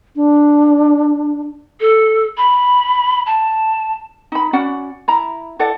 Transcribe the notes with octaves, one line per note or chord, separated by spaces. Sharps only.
D4
A4
B5
A5
D#4 B5
C#4 F#4 D5 F#5
E4 A#5 B5
E4 A4 D5 F#5